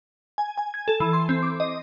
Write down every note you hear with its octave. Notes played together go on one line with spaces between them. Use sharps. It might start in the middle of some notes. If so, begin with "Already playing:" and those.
G#5
G#5
G#6
A4
E3
C6
C4
D6
D#5